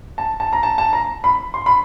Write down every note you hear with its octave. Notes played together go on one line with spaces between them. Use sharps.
A5
A5
A#5
A5
A5
A#5
B5
C6
B5